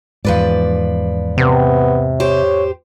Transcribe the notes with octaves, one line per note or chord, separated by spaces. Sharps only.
E2 G#2 F3 B4 D5
C3 B3
G4 C5 C#5